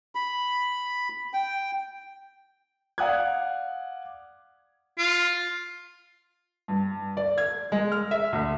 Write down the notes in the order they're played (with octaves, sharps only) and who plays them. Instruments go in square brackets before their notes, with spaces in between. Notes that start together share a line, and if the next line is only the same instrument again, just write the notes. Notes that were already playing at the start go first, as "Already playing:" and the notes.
[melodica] B5
G5
[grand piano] D5 F5 F#5 D#6 F#6 G#6
[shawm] F4
[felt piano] G2
D5
G#6
G#3
F6
E5
D2